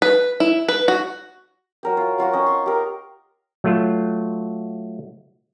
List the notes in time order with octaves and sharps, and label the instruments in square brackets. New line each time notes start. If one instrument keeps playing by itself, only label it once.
[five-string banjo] B4
E4
B4
F#4
[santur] F#3 A#4 G5
F4
F#3 F4 F#4 A#4
C#4 D#5 G5
C6 C#6
G4 A#4
[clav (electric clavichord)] F#3 A3 F4